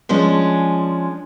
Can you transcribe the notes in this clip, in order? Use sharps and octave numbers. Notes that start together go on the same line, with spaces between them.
F3 G#3 C#4 D4